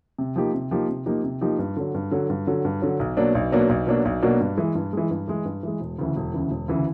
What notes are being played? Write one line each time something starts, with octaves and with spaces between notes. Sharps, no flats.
C3
F3 A#3 D#4 G4
C3
F3 A#3 D#4 G4
C3
F3 A#3 D#4 G4
C3
F3 A#3 D#4 G4
G2
D3 F#3
G2
D3 F#3
G2
D3 F#3
G2
D3 F#3
B1
B2 F#3 A#3 D4
B1
B2 F#3 A#3 D4
B1
B2 F#3 A#3 D4
B1
B2 F#3 A#3 D4
G2
E3 G#3
G2
E3 G#3
G2
E3 G#3
G2
E3 G#3
E1
D2 C#3 E3
E1
D2 C#3 E3
E1
D2 C#3 E3